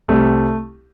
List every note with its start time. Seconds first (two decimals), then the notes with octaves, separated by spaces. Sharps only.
0.08 C2 C3 G3 A3